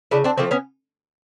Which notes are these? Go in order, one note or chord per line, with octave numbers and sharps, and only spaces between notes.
C#3 D4 E4
C4 D4
F3 A3 A#3 C4
B3 C#4